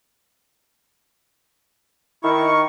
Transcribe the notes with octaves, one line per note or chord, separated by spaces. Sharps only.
D#3 E4 C#6